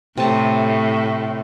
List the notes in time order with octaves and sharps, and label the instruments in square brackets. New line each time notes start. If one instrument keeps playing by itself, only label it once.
[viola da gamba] A2 [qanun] C3 A5 A#5